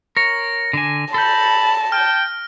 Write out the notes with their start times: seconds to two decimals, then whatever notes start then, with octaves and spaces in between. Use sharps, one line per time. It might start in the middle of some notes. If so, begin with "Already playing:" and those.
0.17 A#4 C#5 A#6
0.73 D3 D4 G#5
1.14 A4 A5 B5 G6
1.92 G5 F6